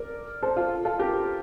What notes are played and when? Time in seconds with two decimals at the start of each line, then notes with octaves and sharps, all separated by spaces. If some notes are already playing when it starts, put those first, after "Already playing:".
Already playing: A#4 D5
0.43 A4 C5
0.57 F4
0.85 F4 A4
0.99 G4 A#4